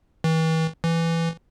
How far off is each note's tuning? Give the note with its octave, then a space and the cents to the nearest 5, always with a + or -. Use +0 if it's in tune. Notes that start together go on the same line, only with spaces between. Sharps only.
E3 -40
E3 +10